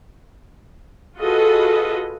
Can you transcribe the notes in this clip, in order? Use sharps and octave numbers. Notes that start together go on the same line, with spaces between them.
F4 F#4 G#4 A4 B4 D#5